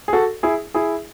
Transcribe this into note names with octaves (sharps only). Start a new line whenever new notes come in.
G#4
F#4 A4
E4 G#4
E4 G#4